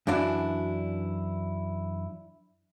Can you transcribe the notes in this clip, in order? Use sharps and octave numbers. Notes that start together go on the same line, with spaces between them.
F#2 E3 D4 E4